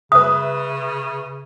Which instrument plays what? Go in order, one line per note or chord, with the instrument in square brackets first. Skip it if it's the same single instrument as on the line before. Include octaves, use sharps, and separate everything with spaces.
[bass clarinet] C#3 [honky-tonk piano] B4 E5 [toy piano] D#6